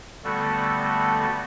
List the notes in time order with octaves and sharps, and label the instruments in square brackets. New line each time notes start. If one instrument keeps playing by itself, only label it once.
[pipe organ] D3 G3 A3 B3 F#4 A4